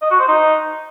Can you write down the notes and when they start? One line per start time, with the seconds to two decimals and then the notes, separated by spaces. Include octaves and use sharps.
0.01 D#5
0.10 F#4
0.19 C5
0.28 D#4